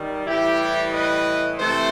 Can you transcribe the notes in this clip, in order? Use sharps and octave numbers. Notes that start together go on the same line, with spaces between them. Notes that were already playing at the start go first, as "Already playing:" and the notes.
Already playing: D#3 G3
A2 E3 G3 E4 G4
B4 D#5
C3 E3 A3 A4 C5